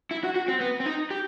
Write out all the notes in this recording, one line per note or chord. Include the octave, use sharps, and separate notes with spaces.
E4
F#4
F#4
C4
B3
C4
D#4
G4